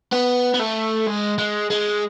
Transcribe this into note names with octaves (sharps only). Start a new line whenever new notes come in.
B3
B3
A3
G#3
G#3
G#3